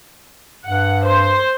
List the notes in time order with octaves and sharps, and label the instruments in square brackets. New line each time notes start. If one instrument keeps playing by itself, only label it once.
[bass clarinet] G2 [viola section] F#5
[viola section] C5